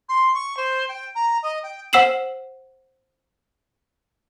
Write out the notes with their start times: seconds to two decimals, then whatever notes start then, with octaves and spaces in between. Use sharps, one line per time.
0.08 C6
0.34 C#6
0.57 C5
0.88 G5
1.15 A#5
1.42 D#5
1.63 G5
1.93 C5 F#5 E6 C7 E7 F#7